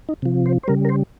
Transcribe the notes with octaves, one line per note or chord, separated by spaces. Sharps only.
D#4
C3 F3
C5
C5
C#3 G3 A#4
A#4
C5